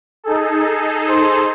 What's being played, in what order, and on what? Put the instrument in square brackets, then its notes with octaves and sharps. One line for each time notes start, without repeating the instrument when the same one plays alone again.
[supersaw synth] D#4 G#4 A4
[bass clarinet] C5